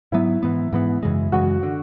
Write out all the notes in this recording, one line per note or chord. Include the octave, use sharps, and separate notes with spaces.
G#2 F#3 B3 E4
G#2 E3 B3
G#2 E3 B3
F#2 C#3 E3 G#3
F#2 C#3 E3 G#3 F#4
D3